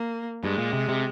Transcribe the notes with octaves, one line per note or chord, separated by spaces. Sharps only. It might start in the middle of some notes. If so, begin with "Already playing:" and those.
Already playing: A#3
G2 G#3
A#2
C3
C3